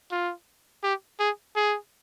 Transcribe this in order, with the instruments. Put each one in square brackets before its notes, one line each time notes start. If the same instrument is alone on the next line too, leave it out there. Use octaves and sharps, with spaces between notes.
[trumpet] F4
G4
G#4
G#4